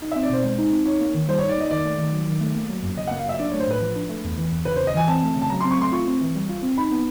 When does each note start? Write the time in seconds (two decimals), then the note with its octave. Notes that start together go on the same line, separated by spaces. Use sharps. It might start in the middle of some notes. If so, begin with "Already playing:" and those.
0.02 D#4
0.12 C4 E5
0.23 D5
0.29 B2 C5
0.43 G#3 C5
0.58 D#4
0.72 C4
0.86 D#4 C#5
1.00 A#3
1.14 D#3
1.29 G3 C5
1.38 D#4 C#5
1.49 D5
1.56 A#3 D#5
1.71 D#3 D5
1.85 A3
1.98 D#3
2.13 F#3
2.27 D#3
2.41 A3
2.55 A#3
2.70 F#3
2.83 F#2
2.97 C#3 D#5
3.07 A#3 F#5
3.19 F5
3.26 F#3 E5
3.39 D4 D5
3.50 A3 C#5
3.60 C5
3.67 A2 B4
3.82 F3
3.96 D4
4.09 A3
4.24 E2
4.38 E3
4.52 E2
4.65 C#3 B4
4.76 C5
4.80 E2
4.87 D#5
4.94 E3 G#5
5.08 C4 A5
5.23 A3
5.36 C#3
5.42 A5
5.50 F#3 A#5
5.60 C4 C6
5.71 C#6
5.78 A3 C6
5.92 F4 C#6
6.07 C4
6.21 E3
6.35 G3
6.49 F4
6.63 C4
6.78 D#4 B5
6.91 B3